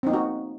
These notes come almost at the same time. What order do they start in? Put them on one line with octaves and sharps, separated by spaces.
C4 D#4 A#3 F#4